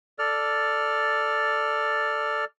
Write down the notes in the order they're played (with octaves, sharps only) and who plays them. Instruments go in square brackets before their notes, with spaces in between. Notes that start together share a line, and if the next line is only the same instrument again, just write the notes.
[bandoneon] A4 D5 F6